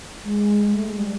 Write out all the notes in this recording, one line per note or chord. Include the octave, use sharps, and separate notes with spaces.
G#3
G#3
A3
G#3
G3